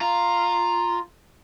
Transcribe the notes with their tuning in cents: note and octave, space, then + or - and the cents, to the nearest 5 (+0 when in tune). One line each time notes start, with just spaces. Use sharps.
F4 +0 A#5 +0